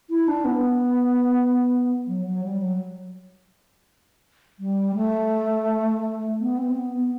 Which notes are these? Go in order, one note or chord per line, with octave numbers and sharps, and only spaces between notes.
E4
D4
B3
F#3
F#3
G3
F#3
G3
A3
B3
C4
B3
B3